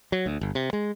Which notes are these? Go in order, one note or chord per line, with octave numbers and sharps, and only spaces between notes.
F#3
D2
G1
C3
G#3